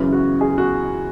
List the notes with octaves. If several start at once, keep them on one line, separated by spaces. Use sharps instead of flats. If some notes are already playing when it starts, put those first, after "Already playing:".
Already playing: F#2 C#3 E3
F#4
G#4
F#4